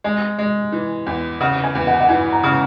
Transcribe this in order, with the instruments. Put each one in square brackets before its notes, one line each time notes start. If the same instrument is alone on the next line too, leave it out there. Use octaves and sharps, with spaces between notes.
[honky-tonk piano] G#3 [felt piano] G#5
[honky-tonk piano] G#3
E3
E2
[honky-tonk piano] C#3 [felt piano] F#5
[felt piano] G#5
[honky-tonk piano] E2
[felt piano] F#5
G#5
F#5
[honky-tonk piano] E3 [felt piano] G#5
[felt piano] A#5
[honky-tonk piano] C#3